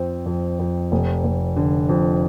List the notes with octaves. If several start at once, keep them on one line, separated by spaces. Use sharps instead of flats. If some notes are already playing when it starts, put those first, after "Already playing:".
Already playing: F2 C4
F2
F2
F1
F1
D3
F2